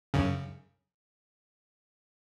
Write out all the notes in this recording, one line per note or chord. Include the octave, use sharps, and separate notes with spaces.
F#2 C#3